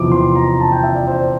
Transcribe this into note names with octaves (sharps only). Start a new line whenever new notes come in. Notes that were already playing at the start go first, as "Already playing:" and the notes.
Already playing: E2 C3 F3 C4 E4 D6
C6
A#5
A5
G5
E5
D5
C5